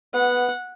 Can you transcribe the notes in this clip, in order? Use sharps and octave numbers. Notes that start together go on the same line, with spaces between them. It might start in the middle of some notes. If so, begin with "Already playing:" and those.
B3 F#5